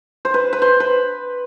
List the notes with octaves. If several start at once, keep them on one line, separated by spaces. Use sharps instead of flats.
C5
B4
B4
C5
B4